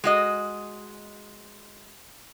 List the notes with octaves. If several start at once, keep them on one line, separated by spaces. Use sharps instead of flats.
G#3 F#4 D#5